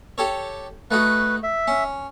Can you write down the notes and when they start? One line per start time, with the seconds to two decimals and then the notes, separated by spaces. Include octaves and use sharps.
0.18 G4 A4 C#5
0.91 A3 D#4 F#4 B4
1.43 E5
1.68 C#4